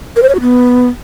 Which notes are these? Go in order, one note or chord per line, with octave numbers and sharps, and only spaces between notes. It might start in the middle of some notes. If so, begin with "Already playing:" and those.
A#4
C5
C#5
F#4
B3